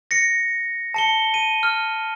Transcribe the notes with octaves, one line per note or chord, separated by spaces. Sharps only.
A#6 C#7
A5 C#7 G7
D#7
F6